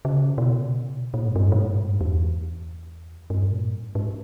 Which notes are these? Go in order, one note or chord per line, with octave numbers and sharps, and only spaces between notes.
C#3
B2
C#3
B2
A#2
G#2
G2
A#2
G#2
G2
E2
G2
A#2
G#2
G#2